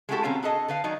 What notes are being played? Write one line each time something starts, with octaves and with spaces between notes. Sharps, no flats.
G#3 A3 E4 F#4 G4 A4
B2 D3 C4 C#4 F5 A#5
D4 G#4 A4 D#5
D3 B4 F5
D#3 F#3 D4 D#4